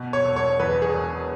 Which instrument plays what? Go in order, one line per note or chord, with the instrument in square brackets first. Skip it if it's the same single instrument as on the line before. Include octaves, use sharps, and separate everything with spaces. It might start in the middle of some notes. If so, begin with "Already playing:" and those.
Already playing: [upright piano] B2
C#5
E1
C#5
E2 B4
G#4
E1